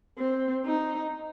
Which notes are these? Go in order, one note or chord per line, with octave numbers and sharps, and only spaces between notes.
C4
D#4